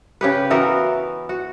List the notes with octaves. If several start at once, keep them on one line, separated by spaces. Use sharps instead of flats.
C#3 G4 B4
E3 B3 F#4 A#4
F#4